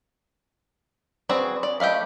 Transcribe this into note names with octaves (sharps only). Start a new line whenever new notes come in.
C4 F#4 G#4 B4 D5
D5
A3 G4 D#5 F5 B5